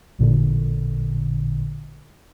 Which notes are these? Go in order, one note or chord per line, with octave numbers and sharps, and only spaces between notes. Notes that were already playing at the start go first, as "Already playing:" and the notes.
A1 A#2 D3